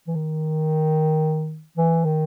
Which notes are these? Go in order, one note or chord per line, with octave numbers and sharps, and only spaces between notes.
E3
D#3
E3
D#3